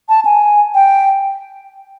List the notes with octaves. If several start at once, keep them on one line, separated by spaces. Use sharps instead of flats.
A5
G#5
G5